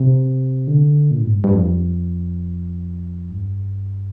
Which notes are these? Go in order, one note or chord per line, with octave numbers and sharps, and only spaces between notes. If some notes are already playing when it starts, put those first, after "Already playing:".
Already playing: C3
D3
A#2
G#2
G2
G2
F2
G2